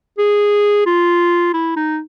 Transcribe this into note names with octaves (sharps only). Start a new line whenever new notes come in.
G#4
F4
E4
D#4